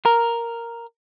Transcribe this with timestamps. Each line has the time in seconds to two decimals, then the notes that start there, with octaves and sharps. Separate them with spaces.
0.06 A#4